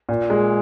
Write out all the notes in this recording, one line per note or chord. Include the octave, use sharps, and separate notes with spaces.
A#2
G#3